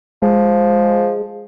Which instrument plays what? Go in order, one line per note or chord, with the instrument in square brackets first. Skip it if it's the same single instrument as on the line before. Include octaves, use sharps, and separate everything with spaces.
[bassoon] F3 [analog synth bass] G#3